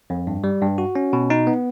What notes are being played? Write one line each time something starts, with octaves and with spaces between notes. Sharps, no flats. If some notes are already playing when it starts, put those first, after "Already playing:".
F2
G2
G3
G2
F#4
C#4
B2
D#4
B3